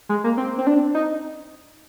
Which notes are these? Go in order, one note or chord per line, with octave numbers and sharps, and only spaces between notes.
G#3
A#3
C4
C4
D4
D#4